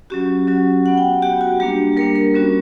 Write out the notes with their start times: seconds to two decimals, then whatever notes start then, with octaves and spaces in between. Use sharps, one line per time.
0.10 F#3 C#4 F#4 G4
0.47 F#3 C#4 F#4
0.85 B3 F#4 F#5
0.98 G5
1.22 B3 F#4 G4
1.41 F#4
1.60 G3 A#3 D4 G4
1.97 G3 A#3 D4 A#4
2.16 A#4
2.34 G3 C#4 F#4